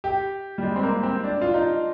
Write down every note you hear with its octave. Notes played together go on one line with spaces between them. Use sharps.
G4
G3
G#3
C4
A#3
C4
D4
F4
D#4